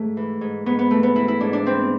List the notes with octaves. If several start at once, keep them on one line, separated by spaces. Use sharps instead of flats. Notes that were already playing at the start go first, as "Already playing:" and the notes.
Already playing: G#2 A3
E3
G#2
G#2 B3
B3
E3 A3
B3
E3 E4
E4
G#2 D4
D4
E3 C4